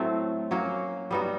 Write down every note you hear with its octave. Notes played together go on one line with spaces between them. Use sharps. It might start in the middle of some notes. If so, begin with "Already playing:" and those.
Already playing: A2 F#3 A3 C4
F#3 A#3 C#4 F#4
G3 B3 D#4 F#4